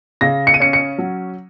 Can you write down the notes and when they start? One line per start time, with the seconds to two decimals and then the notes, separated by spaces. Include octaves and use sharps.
0.21 C#3 A#6
0.47 C#7
0.54 D#7
0.60 C#4 C#7
0.73 C#7
0.98 F#3